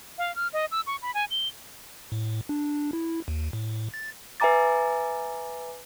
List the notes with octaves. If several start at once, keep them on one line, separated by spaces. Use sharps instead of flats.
F5
F6
D#5
E6
C#6
B5
G#5
G7
A2
D4
E4
D#2
A2
A6
B4 E5 G#5 A#5 D6 A6